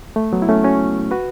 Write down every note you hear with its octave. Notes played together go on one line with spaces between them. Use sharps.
A3
F#3 B3
E4
A3 C#4
C#4 F#4
F#4 B4